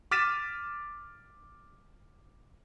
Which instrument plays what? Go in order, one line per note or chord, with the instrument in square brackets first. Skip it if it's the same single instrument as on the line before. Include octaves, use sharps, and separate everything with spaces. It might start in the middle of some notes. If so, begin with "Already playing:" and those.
[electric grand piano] D6 F6 A6 B6 D#7 E7